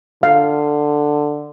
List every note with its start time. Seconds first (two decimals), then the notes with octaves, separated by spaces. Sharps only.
0.23 D3 F5